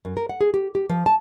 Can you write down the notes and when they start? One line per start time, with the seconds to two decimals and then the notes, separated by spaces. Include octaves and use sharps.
0.05 F#2
0.17 A#4
0.29 F#5
0.41 G#4
0.54 G4
0.75 G4
0.89 F3
1.06 A5